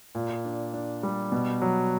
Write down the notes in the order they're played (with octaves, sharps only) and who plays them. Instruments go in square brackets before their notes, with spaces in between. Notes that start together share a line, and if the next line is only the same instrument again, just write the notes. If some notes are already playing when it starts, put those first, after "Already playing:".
[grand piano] A#2
D4
D4
G3
B2
F#3